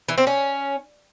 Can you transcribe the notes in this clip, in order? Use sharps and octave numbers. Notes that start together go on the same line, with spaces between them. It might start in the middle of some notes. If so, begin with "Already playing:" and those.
E3
C4
C#4